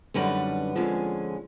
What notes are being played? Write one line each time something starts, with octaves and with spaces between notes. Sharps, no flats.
F#2 D3 G3 B3 D#4 B4
F2 D3 F3 G#3 C#4